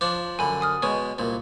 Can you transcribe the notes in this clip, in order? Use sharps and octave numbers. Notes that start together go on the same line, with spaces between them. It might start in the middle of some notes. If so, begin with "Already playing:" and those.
F3 D4 C#5 D6
F#2 D3 G#5 B5
G#5 D#6 F6
B2 G#3 C#5 G#5 C#6
C2 A#2